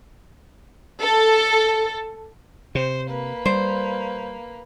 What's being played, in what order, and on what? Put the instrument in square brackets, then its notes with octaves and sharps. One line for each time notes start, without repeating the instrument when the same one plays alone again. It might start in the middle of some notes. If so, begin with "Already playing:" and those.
[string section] A4
[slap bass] C3 [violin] C5
[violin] A#3 B4
[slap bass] G3 [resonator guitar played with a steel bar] C5